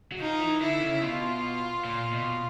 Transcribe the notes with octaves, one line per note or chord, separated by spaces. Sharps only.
F#3
F3 D#4
E3
D3 E4
C#3
B2 F4
A#2
B2